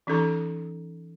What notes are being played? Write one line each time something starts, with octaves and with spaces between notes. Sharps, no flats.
E3 C#4 D#4 A4 A#5